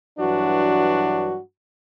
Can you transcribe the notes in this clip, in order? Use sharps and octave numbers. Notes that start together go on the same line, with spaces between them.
G2 E3 F#3 D4 F#4